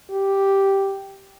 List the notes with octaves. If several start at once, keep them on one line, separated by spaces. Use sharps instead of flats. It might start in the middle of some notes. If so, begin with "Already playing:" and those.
G4